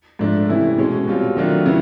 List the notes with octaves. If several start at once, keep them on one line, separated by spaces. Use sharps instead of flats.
G#2 F3 A3 D4
C3 E3 A3 C#4 E4
B2 G#3 C#4
B2 G3 C4 F4
D#3 F#3 A3 D4 F4
C#3 F#3 B3 E4